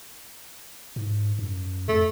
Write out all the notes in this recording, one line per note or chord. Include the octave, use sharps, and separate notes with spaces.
G#2
F#2
F2 A3